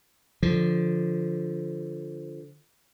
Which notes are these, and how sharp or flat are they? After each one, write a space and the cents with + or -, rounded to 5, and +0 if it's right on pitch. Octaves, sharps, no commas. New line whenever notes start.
D3 +0 F3 +0